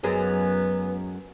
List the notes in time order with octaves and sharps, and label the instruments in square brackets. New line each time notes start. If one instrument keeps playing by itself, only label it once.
[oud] F#2 F#3 G#3 [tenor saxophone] B3